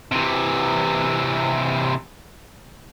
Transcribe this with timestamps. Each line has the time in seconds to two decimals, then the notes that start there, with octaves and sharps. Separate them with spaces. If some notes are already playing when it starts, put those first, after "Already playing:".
0.12 C3 E3